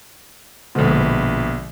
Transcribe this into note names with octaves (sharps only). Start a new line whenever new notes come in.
A#1 B2 D3 G#3 A4